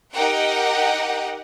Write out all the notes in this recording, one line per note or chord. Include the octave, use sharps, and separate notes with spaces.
D#4 G4 A#4 F#5 G5